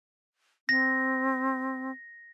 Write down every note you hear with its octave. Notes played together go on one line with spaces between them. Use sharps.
C4 A#6